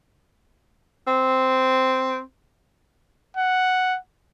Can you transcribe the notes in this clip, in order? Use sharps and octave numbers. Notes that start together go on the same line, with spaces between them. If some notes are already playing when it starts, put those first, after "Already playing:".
C4
F#5